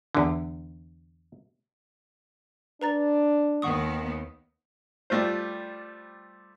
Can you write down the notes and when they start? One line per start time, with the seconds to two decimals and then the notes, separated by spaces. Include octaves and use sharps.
0.15 E2 D3
2.81 D4 B4 A#5 A6
3.62 D#2 D#3 B3 F#5 C#6 D#6
5.10 G3 A3 F4 C5